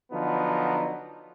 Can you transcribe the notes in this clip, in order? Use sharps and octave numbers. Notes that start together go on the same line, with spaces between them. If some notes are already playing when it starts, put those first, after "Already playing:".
D3 F3 F#3 B3 D#4